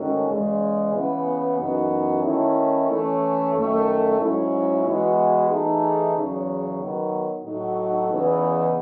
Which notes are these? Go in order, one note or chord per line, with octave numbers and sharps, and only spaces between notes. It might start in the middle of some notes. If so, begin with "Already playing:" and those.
Already playing: G#2 D#3 A3 C#4 F#4
E2 C#3 G#3
C#3 E3 B3 E4
F#2 E3 B3 D#4 F#4
D#3 A3 C#4 E4
E3 A3 C#4
F#2 D#3 A3
G#2 F#3 C#4 E4
E3 G#3 B3 F#4
E3 A3 D#4 G#4
E2 C#3 F#3
D#3 F#3 B3
A2 F#3 A3 D#4 F#4
E2 C#3 E3 B3 D#4